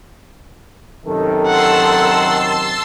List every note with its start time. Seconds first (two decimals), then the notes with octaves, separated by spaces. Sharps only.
1.06 F#2 C3 D#3 A4
1.46 F#5 A5 C6 E6